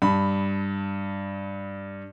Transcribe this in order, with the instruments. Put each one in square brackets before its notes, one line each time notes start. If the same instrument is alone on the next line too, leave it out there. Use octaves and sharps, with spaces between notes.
[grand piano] G2 B5